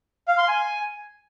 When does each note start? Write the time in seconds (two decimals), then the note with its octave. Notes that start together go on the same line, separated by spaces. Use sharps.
0.28 F5
0.38 C6
0.48 G#5